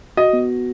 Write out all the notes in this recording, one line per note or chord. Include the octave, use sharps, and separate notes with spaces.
F#4 D#5
B3